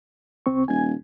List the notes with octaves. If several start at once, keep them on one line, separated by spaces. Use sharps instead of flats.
C2 C4 C#6
D#1 G#5 G#6